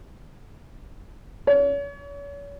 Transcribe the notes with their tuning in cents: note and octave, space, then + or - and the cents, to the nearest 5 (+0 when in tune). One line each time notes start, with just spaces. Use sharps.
C#5 +40